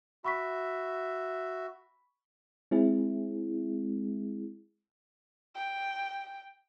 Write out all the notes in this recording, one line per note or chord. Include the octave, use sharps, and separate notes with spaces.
F#4 E5 B5 C#6 B6
G#3 C4 E4 G#4
G5